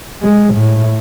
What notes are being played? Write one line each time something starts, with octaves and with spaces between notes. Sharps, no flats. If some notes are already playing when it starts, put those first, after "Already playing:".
G#3
A2